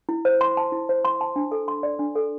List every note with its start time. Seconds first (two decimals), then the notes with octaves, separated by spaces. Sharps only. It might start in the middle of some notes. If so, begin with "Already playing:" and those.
0.09 E4
0.25 C5
0.41 C6
0.57 A5
0.72 E4
0.89 C5
1.05 C6
1.21 A5
1.36 D4
1.52 A4
1.68 C6
1.83 D5
1.99 D4
2.16 A4